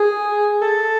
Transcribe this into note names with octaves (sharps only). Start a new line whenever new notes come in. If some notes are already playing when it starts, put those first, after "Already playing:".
Already playing: G#4
A4